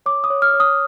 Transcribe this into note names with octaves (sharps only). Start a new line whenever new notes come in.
C#5 D6
D#6
C#5
F6
C#5
D#6